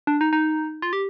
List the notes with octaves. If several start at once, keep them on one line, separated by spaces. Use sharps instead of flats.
D4
D#4
D#4
F4
G4